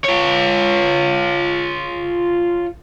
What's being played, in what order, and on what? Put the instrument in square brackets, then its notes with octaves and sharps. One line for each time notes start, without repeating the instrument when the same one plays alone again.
[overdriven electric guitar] F4 C#5